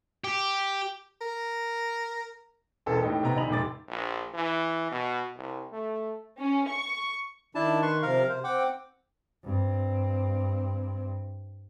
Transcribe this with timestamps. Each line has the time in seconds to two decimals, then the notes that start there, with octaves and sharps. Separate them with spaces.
0.24 G4
1.21 A#4
2.86 E1 A1 A4 A#4
3.02 A2 D#4 G4
3.23 C3 B3 A#5
3.36 A#1 D#3 D#5 B5 F7 F#7
3.49 F1 G#2 C3 D6 A6
3.88 A#1
4.34 E3
4.91 B2
5.37 C2
5.73 A3
6.40 C#4
6.69 C#6
7.55 D#3 D4 E4 A5
7.82 B4 C6 C#6
8.02 C3 F3 A#4 F5
8.29 C3 C5
8.44 C4 F#5 G5 D6
9.44 G2 C4